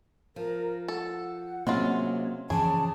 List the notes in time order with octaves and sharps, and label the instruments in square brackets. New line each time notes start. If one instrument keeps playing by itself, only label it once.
[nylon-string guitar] F3 [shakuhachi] A#4
[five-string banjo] A4 [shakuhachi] F#5
[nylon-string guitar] C3 F#3 G#4 [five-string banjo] G#3 F4 [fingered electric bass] A#3 C4 C#4
[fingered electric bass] F#2 E3 F3 [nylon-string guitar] C#3 D4 [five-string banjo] G#4 [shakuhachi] A5